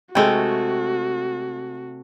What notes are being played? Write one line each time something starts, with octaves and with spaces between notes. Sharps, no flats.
C3 G#3 A3 F#4 G5